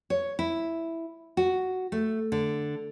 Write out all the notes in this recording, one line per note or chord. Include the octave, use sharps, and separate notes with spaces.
C#5
E4
F#4
A3
D3